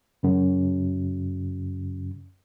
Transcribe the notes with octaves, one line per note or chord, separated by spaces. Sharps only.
F#2 C#3